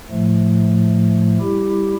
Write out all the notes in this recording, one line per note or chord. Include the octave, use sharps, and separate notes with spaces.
A2 F3 A3
G3 E4 G4